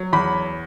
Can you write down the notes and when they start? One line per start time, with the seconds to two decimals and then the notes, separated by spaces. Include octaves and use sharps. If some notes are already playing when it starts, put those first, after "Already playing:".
Already playing: F#3
0.13 E2 B5